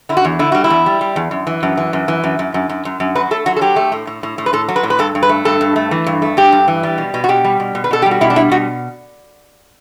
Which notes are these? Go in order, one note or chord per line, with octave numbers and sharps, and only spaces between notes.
D3 E4
F#4
E2
D3 E4
G3 F#4
E4
E2
G3
G3
E2
F#2
E3
F#2
E3
F#2
E3
F#2
F#2
F#2
F#2
F#2
F#2
F#3 B4
A3 A4
F#3 F#4
A4
F#3 G4
A3
A2
A2
A2
A2
B4
A2 A4
F#3
B4
A2
B4
G2 A4
G2
B4
A3
G2 A4
G2
A3
E3
G2
A3
G2 G4
G2
E3
G3
B2
B2
F#4
B2 G4
G3
B2
B2
B4
B2 A4
G4
G3
F#4
B2 E4
D4
G3 E4
B2 F#4